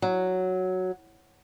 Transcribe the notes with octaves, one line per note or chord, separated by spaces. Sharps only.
F#3